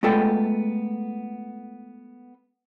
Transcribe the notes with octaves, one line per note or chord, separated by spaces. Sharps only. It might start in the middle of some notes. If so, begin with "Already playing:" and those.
G#3 A3 B3 F4 A4 G5